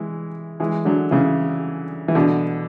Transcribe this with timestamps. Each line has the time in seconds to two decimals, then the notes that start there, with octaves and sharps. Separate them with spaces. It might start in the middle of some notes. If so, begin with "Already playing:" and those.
Already playing: E3 G#3
0.60 E3 G#3
0.85 D3 F#3
1.11 C#3 E3
2.08 E3
2.15 B2 D3